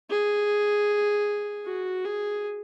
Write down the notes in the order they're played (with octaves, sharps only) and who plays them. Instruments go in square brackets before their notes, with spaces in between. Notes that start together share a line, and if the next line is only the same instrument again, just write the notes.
[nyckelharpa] G#4
F#4
G#4